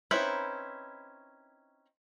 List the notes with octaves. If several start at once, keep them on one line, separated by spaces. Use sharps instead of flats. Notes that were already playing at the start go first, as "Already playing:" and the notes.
C4 C#4 D#4 E4 B4